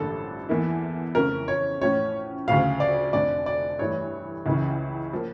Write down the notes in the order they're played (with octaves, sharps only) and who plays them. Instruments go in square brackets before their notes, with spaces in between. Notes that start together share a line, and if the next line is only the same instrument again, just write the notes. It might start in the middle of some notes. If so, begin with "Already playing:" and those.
Already playing: [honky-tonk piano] A1 G2 D3 F3 A#3 [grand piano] A4
[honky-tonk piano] E2 E3 A#3 E4
[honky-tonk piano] F2 C#3 E3 A3 C#4 [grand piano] A#4
[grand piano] C#5
[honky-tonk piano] A1 A2 F3 C#4 E4 [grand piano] C#5
[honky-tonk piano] D2 C#3 F3 [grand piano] F5
[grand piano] D5
[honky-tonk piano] F1 F2 D3 [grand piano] D5
[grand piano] D5
[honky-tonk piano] G2 E3 A3 [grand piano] C#5
[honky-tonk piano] C#2 C#3 E3
F3 A#3